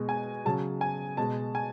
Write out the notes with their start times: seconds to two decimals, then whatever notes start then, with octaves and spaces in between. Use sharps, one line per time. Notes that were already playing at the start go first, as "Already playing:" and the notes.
Already playing: B2 G#3
0.09 G#5
0.45 C#3 F#3 A5
0.81 G#5
1.17 B2 G#3 A5
1.55 G#5